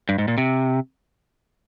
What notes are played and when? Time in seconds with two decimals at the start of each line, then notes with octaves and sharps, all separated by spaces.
0.09 G2
0.18 G#2
0.28 A#2
0.38 C3